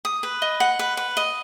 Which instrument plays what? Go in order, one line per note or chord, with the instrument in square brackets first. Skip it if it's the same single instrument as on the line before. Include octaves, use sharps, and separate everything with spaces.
[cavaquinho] D#6
B4
D#5
F#5
B4
B4
D#5